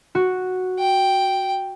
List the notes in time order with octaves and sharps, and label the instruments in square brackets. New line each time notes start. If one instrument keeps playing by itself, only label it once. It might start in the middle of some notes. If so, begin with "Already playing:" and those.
[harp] F#4
[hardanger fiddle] G5